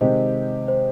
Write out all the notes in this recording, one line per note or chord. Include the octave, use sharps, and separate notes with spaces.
C3 D#3 G#3 C4 G4 C5 D#5
C5